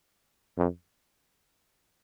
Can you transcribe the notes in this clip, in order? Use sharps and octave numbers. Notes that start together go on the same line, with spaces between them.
F2